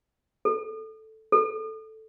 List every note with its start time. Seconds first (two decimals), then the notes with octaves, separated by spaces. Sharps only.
0.45 A4
1.32 A4